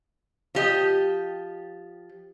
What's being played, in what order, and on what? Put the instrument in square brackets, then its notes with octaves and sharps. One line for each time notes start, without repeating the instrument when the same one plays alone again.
[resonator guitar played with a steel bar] F3 G4 D#5